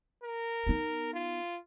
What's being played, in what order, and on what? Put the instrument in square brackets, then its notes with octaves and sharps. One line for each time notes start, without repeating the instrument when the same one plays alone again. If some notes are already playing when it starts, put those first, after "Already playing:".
[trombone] A#4
[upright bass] B3 D#4
[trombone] F4